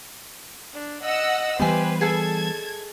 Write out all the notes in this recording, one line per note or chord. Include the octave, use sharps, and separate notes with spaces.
D4
D#5 F#5 E6
E3 G3 B3 G4 B4 C5 G#5
G#4 A4 A5 G#6